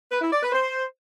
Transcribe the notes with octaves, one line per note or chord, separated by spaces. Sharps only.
B4
E4
D5
B4
C5